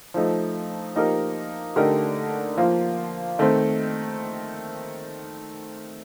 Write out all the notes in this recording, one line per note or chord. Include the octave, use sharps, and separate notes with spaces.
F3 A3 D#4
F3 A#3 D#4 G4 A#4
D3 A3 D#4 G4 A#4
F3 A#3 F4
D#3 A3 C4